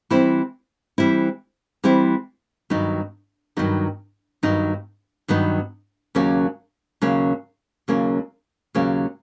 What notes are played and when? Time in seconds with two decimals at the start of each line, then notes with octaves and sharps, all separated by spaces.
0.10 E3 G3 C4 E4
0.98 E3 G3 C4 E4
1.84 E3 G3 C4 E4
2.70 G2 D#3 F#3 B3 D#4
3.57 G2 D#3 F#3 B3 D#4
4.43 G2 D#3 F#3 B3 D#4
5.28 G2 D#3 F#3 B3 D#4
6.15 D#2 C#3 F#3 A#3 C#4
7.02 D#2 C#3 F#3 A#3 C#4
7.88 D#2 C#3 F#3 A#3 C#4
8.75 D#2 C#3 F#3 A#3 C#4